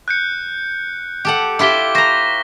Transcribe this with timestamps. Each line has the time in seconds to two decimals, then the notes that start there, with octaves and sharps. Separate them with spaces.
0.08 F#6 G6 C#7
1.25 G4 A4 F#5
1.59 E4 F4 G4 D6 B6 G7
1.95 C5 A#5 C#6 A#6